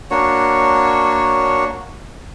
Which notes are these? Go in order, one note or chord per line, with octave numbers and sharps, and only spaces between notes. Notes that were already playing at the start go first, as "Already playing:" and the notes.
A#3 D4 F#4 C#5